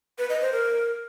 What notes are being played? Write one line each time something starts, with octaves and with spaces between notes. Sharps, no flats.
B4
D#5
C5
A#4